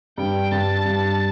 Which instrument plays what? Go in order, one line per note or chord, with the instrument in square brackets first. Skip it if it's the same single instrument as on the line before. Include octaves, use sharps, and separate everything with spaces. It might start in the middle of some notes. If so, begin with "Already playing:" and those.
[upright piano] G2 [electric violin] G5
[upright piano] G2 [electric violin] A5
[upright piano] G2